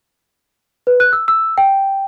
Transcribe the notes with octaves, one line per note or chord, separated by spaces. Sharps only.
B4
F#6
E6
E6
G5